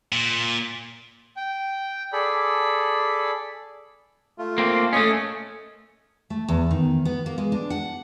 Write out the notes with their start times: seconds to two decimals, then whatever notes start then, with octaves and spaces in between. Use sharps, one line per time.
0.12 A#2
1.37 G5
2.13 G#4 A4 D5 B5
4.38 A3 F4
4.58 A#3 C4
4.93 A3 C#4 D#5 G#5
6.30 A3
6.48 E2
6.71 D#3
7.05 B3
7.26 A#3
7.38 G#3
7.52 D4
7.70 F#5